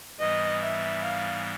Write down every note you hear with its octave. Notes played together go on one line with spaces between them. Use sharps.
G#2 E3 G3 B3 D#5
E5
F5